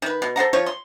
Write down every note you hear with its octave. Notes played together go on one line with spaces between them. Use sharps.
D#3 B4
B2
A4 C5 F#5 A#5
F3 F4 C#5
C6